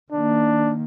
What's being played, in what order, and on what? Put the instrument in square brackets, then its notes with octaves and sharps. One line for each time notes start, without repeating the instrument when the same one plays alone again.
[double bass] D#3 A#3 [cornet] D4